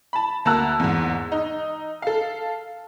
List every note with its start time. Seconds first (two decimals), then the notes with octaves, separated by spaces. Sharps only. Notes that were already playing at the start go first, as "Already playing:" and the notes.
0.13 A5 B5
0.45 D2 A#3 A5 A#5 E6 F#6
0.80 E2 G#2
1.32 D#4
2.02 A4 F5